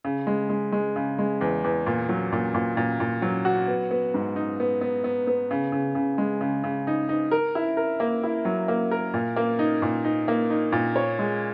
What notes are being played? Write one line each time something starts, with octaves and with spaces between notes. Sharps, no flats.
C#3
G#3
G#3
G#3
C#3
G#3
E2
E2
A#2
F#3
A#2
A#2
A#2
A#2
F#3
F#4
B3
B3
G#2
D#4
B3
B3
B3
B3
C#3
C#3
C#3
G#3
C#3
C#3
D#4
D#4
A#4
E4
A#4
A#3
E4
F#3
A#3
A#4
A#2
A#3
D#4
A#2
D#4
A#3
D#4
A#2
C#5
G#3